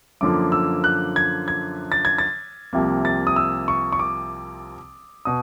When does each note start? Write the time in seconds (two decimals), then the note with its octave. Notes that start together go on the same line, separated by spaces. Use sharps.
0.21 F#2 D3 F3 A#3 D6
0.52 E6
0.84 F#6
1.16 G#6
1.48 G#6
1.92 A6
2.05 G#6
2.18 A6
2.73 C2 C3 F3 A#3
3.05 A6
3.27 D#6
3.36 E6
3.68 C#6
3.92 C#6
3.99 D6
5.25 B2 D#6